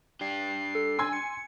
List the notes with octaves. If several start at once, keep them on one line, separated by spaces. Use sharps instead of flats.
D4 G4 C7
A4
G#5 C6 E6 G#6
C#7